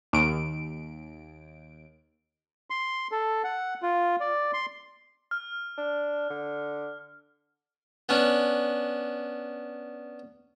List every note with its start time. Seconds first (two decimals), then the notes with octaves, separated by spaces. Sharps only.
0.13 D#2 D7
2.70 C6
3.12 A4
3.44 F#5
3.83 F4
4.20 D5
4.54 C6
5.31 F6
5.78 D4
6.30 D3
8.09 B3 C#4 D4